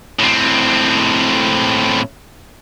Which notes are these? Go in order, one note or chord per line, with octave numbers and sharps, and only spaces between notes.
A2 C4